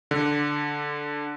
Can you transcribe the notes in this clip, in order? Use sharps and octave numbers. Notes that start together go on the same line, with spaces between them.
D3